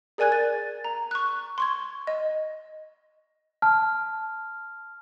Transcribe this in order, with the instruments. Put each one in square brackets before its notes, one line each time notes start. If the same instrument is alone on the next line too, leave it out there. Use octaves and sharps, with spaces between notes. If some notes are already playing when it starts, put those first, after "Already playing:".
[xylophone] G#4 A#4 D5 G#5 F#6 G#6
A6
A#5
C#6 F#6
C6 C#6 G#6
D#5
[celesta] A5 [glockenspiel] F6